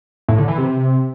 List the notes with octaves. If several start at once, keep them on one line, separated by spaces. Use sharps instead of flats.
A2
D3
E3
C3